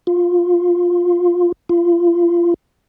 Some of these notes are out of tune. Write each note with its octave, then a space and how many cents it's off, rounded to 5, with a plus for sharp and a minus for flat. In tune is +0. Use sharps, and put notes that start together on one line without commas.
F4 +10
F4 -25